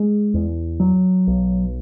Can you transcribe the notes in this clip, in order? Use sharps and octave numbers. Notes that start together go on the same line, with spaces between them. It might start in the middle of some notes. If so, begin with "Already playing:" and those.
Already playing: G#3
E2
F#3
B1